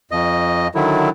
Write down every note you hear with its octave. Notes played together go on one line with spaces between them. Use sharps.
F2 D#5
D3 D#3 F#3 E4